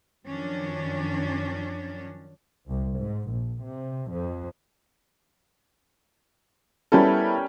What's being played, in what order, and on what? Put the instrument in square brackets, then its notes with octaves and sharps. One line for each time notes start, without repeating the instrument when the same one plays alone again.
[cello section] F#2 D#3 F3 C#4 D4
[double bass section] C2
G#2
A#1
C3
F2
[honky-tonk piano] G3 C#4 A#4 [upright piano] B3 E4 A4